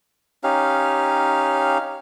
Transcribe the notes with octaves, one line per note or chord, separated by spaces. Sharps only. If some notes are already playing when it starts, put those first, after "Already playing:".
C#4 D#4 G4 F5